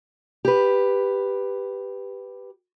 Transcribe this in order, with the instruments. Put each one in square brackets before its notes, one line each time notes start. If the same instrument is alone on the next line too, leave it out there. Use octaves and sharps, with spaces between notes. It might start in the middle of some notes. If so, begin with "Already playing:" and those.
[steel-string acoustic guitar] G4 B4